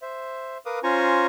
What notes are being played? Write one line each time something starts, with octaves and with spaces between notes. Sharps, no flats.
C5 E5
A#4 B4 F5 D6 D#6
C#4 F4 C5 G#5 A#5 C#6